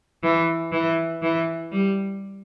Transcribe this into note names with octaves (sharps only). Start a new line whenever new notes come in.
E3
E3
E3
G3